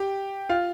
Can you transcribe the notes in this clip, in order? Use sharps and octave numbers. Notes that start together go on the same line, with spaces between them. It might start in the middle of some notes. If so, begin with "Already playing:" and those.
Already playing: G4 G5
F4 F5